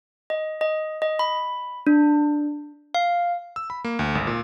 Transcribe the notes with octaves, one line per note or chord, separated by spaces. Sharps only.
D#5
D#5
D#5
B5
D4
F5
E6
B5
A#3
D2
G#1
A#2